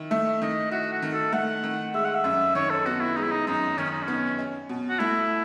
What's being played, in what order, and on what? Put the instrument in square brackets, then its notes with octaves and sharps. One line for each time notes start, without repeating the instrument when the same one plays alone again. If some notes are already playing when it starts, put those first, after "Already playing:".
Already playing: [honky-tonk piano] D#3 E4
[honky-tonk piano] A3 [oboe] E5
[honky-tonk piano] D#3 [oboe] D#5
[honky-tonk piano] E4 [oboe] F#4
[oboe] F#4
[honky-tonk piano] D#3
[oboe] A4
[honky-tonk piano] A3 [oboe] F#5
[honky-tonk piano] D#3
[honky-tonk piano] G#3 [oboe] E5
[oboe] F#5
E5
[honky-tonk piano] F#2
[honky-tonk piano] D#3 [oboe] C#5
[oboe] A4
[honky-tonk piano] B3 [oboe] F#4
[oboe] E4
[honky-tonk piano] G#3 [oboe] D#4
[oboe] E4
D#4
[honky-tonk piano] F#2 [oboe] D#4
[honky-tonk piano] D#3 [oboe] C#4
[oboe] D#4
C#4
[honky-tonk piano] B3
C#4
B2
[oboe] F#4
[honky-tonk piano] A3 [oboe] E4